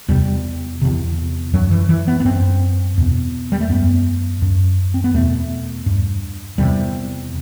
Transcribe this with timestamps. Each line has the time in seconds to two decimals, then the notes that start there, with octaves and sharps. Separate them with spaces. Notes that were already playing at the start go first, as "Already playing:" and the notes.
0.08 E2 C3 G3
0.82 E2 C3
1.53 F#2 F#3
1.71 E3
1.89 E3
2.08 B3
2.20 B3
2.25 F#2 C4
2.98 E2 B2
3.52 G3
3.60 A3
3.70 F#2 B3
4.42 F#2
4.94 C4
5.04 B3
5.14 E2 B2 A3
5.86 G2
6.58 E2 C3 G3